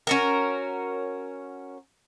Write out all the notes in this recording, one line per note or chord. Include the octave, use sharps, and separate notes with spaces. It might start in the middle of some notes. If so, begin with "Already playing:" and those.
C#4 F#4 A#4